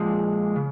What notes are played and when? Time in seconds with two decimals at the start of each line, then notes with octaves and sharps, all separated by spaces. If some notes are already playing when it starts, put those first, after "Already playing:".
Already playing: A#2 F3 G#3
0.56 C#3